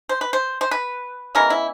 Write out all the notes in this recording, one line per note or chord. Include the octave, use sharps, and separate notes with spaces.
C5
B4
C5
C5
B4
C#3 E3 G#3 B3 A#4
E4